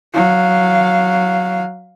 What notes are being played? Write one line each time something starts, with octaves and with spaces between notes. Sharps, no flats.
F#3 F5